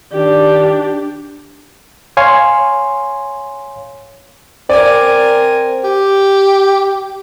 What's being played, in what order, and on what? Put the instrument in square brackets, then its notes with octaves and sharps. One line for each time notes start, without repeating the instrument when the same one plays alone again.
[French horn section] D#3 D5 [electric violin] D4 G4
[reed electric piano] C#5 F5 G#5 C6
[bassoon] C4 [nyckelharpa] A#4 G#5 [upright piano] D5
[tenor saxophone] G4